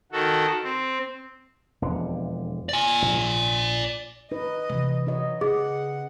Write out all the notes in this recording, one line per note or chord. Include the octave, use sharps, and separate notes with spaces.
D#3 F#4 A4
C4
E1 F2 D3
D5 G#5
A#1
D#4 B4 D#5
C3 E3
F#3 D#4 D#5
C#3 G#4 F#5